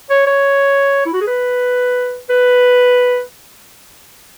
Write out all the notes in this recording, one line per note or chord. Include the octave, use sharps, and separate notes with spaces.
C#5
C#5
E4
F#4
G#4
B4
B4